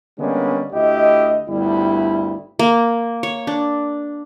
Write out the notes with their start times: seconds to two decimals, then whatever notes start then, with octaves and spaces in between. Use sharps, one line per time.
0.19 D3 G3 G#3 A#3 B3 C#4
0.73 D2 E4 G4 D#5
1.48 G1 D2 G2 G3 E4
2.59 A#3
3.23 C#5
3.47 D4